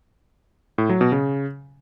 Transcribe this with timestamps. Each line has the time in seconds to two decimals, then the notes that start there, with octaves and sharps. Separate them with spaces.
0.78 A2
0.89 F#3
1.01 B2
1.12 C#3